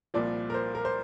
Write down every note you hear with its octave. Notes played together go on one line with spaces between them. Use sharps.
C2 A#2 F3 D5
A#4
C5
A#4
C5